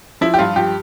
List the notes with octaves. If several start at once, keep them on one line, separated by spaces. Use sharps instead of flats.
F3 E4
G4
G2 F4
F3 G4